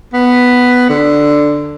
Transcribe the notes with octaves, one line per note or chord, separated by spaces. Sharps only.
B3
D3